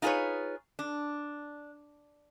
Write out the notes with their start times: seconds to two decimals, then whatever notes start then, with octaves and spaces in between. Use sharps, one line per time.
0.02 D#4 F4 G#4 A#4 B4 C#5
0.79 D4